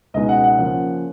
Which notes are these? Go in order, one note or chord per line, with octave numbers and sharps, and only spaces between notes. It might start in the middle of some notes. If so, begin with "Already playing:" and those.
C#2 B2 G#3 B3 D#4 D#5
F#5
F#5
C#3 F3 A#3 C#4